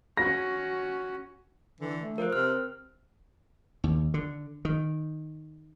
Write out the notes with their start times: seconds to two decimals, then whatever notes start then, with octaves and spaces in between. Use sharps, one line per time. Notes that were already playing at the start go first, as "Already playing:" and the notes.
0.17 C#4 F#4 A#6
1.81 D3 E3
2.02 A3
2.18 F3 A#4 C5
2.33 C3 C4 F6
3.84 D#2
4.14 D3
4.65 D#3